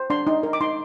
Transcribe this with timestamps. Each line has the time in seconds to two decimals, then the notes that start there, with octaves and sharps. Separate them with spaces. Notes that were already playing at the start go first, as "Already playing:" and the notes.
Already playing: C5
0.10 D4 C6
0.27 D#4
0.43 A#4
0.53 D6
0.61 D#4 C6